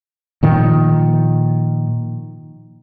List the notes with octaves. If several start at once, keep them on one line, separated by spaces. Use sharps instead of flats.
A#2 D#3 F3